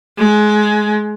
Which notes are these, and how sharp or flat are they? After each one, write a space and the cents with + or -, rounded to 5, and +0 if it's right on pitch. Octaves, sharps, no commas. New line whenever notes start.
G#3 +20